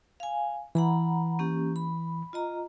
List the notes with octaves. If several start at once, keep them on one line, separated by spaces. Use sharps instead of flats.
F5 G#5
E3 F#5 A#5 B5
A#3 C#4 G4
B5
F4 D#5 A#5